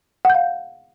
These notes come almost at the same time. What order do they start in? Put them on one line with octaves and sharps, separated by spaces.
F#5 G6 F5